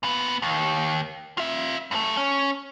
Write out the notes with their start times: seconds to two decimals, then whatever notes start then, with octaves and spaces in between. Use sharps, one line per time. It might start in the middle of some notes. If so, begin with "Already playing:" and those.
0.03 A#2 B3
0.42 D#2
1.38 F4 E5
1.91 F#2 A3
2.17 C#4